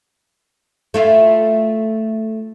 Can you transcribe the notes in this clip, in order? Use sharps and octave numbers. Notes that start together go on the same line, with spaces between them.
A3 E4 F4